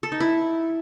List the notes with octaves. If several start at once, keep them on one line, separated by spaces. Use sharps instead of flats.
A4
D#4
E4